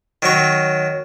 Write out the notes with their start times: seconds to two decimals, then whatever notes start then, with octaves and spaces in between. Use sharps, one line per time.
0.22 D#3 F#3 C#5